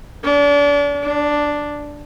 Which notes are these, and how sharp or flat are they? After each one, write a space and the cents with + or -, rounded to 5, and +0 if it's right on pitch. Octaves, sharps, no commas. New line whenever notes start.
D4 -35
D4 +0